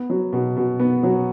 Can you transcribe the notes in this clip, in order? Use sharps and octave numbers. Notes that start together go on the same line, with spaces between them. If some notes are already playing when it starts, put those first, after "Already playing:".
Already playing: B3
F#3
B2
B2
B3
F#3